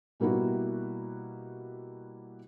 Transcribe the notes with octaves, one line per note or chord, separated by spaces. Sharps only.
B2 G3 A#3 B3 E4 F#4